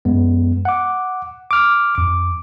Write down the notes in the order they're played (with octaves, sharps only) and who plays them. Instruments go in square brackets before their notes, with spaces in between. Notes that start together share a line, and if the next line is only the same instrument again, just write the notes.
[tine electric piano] F#2 G#3 B3
F#5 D6
D6 F6
F2 D6